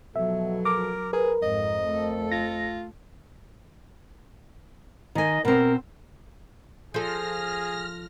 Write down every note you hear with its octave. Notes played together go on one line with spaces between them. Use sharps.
B2 F3 F#3 A4 E5
A#4 D6
G#4 A#4 B4
F2 G#2 D#5
A3 A4
F4 A#6
D#3 D#5 G#5
B2 C4 A#4
F3 G#4 A4 F6 A#6